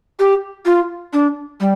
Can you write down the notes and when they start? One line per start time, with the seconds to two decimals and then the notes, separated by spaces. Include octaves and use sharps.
0.19 G4
0.66 F4
1.13 D4
1.60 G3